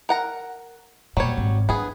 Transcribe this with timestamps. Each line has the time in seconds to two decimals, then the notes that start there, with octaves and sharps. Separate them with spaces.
0.09 A#4 F#5 A#5
1.17 E1 A#2 F#3 G3 C#5
1.37 G#1
1.69 B3 D4 G#4